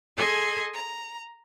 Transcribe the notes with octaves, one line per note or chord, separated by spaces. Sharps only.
G#4 A4 D#5 G#5 C6 G#6
A#5